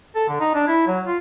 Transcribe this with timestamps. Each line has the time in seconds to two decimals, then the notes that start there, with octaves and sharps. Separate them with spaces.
0.16 A4
0.28 D3
0.40 D#4
0.54 D4
0.68 E4
0.87 F#3
1.07 F4